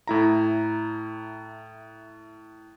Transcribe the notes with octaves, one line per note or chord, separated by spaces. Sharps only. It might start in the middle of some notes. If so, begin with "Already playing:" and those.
A2 E4 A#5